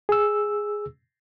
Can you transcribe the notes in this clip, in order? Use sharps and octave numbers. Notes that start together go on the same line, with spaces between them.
G#4 E6